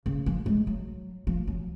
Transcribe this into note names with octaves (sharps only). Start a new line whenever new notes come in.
C#3
F3
G#3
F#3
F3
F#3